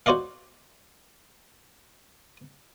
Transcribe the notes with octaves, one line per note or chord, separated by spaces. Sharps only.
F#4 C5 D5 D#5 F5